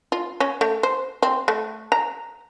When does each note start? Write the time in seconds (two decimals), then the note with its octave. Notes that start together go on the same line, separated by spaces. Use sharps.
0.12 F4
0.40 C#4
0.61 A3
0.83 C5
1.23 C4
1.48 A3
1.92 A#5